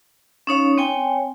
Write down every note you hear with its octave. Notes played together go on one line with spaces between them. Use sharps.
C#4 D#4 C#5 F5
C4 C#5 G5 G#5